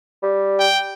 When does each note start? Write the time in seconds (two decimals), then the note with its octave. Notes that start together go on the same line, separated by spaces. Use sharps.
0.23 G3
0.59 G5